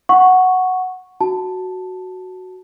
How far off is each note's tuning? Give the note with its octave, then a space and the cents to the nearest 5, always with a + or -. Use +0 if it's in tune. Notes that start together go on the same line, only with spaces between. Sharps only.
F#5 +0 C#6 +0
F#4 +0 A5 +0